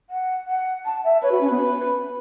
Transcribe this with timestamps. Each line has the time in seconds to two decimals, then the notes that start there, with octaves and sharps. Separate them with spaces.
0.10 F#5
0.47 F#5
0.85 A5
1.04 E5
1.22 B4 C#5
1.31 F#4
1.41 C#4
1.51 B3
1.59 B4